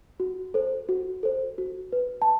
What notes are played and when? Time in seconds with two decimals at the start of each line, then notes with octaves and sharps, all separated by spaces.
0.20 F#4
0.54 A4 C5
0.89 F#4
1.23 A4 C5
1.58 F#4
1.92 B4
2.22 A5